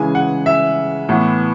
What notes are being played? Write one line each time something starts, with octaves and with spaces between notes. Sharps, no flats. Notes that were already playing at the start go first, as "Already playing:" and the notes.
Already playing: C#3 E3 G#3 G#5
F#5
E5
A2 E3 B3